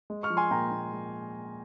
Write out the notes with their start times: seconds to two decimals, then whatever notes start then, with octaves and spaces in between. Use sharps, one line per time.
0.10 G#3
0.23 C#6 F6
0.30 F3
0.37 G#5 C6
0.51 A#2 G5 A#5
0.72 A#2
0.93 G#3